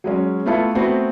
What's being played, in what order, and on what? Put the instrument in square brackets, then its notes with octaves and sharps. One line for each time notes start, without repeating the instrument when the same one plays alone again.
[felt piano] F#3 G#3 C#4
A3 B3 E4 F4 A4
A3 B3 C4 F#4